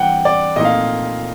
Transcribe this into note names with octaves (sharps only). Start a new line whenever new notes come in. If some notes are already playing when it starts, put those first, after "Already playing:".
Already playing: E3 G3 C4 F#5 G5
D5
A#2 F3 A3 C4 D#4 D#5
F5